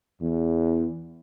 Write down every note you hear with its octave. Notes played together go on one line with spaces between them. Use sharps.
E2